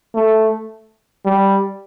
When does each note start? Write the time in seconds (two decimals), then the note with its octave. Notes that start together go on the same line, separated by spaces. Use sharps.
0.15 A3
1.26 G3